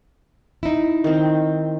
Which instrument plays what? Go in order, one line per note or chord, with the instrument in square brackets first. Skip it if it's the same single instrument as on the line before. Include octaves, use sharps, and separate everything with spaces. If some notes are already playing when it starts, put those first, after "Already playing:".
[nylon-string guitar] D#4 E4
[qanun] D#3 C4